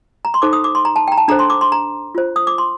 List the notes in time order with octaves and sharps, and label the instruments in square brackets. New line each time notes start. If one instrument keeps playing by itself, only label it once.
[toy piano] A#5
C6
D#4 A4 C5 D6
D#6
D6
C6
A#5
A5
G5 A#5
A5
D4 A4 C5 A#5
C6
D6
C6
A#5
F4 C5
D#6
D6
C6